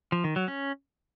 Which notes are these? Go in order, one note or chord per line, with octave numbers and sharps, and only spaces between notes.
F3
D#3
F#3
C#4